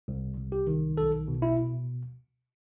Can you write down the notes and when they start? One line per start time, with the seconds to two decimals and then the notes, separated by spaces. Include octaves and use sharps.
0.08 C2
0.37 C2
0.52 G4
0.67 D#3
0.97 B1 A4
1.28 B2
1.42 E4